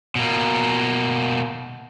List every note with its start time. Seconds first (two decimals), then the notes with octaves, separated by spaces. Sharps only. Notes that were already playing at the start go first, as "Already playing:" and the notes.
0.15 B2 A#3